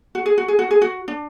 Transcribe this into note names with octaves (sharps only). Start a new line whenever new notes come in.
F#4
G#4
F#4
G#4
F#4
G#4
F#4
D4